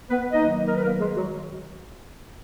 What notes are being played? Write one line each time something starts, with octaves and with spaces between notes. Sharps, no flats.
B3 B4
D#3 F#3 A#3 D#4 D#5
A#4
B4
A#3 A#4
G#3 G#4
F#3 F#4